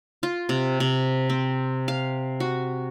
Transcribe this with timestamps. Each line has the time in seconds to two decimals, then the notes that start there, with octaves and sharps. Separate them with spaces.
0.23 F4
0.49 C3
0.80 C3
1.30 C4
1.88 F5
2.40 F#4